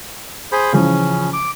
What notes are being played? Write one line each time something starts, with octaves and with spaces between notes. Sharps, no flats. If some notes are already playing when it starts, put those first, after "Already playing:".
G#4 C5 B5
C#3 E3 F3 C#4
D6